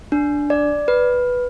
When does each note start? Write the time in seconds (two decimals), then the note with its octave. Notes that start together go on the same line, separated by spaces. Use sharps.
0.12 D4
0.50 D5
0.88 B4